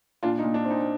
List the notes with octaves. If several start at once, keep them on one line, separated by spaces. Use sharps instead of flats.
A#2 D4 F4
D#4
A#2
D4
C4
D#4